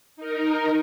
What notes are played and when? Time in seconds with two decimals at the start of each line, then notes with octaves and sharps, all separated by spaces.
0.16 D#4 A#4